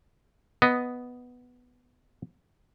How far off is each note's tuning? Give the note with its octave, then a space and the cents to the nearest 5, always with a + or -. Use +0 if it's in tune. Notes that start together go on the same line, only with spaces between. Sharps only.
B3 +0 D#5 +0